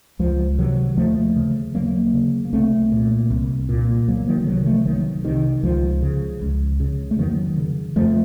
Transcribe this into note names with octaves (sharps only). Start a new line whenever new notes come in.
C#2 F3
C3 D#3 F#3
D#2 F3 A3
C#3
D#2 F#3 A#3
C#3
A#3
C2 A3 C4
A#2
C2
A#2
C2 F#3 A#3
D#3 F#3
C3 D#3 F#3
F3 A3
C2 D#3 F#3
C3 D#3
C#2 F3
C#3
C#2
C#3
A3
F2 D#3 F#3
C#3
F2 F3 A3